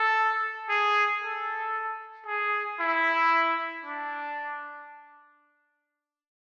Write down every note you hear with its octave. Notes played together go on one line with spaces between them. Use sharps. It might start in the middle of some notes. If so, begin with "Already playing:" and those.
Already playing: A4
G#4
A4
G#4
E4
D4